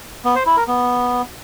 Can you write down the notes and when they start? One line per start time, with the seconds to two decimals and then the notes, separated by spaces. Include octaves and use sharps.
0.25 B3
0.36 C5
0.46 E4
0.57 A#4
0.68 B3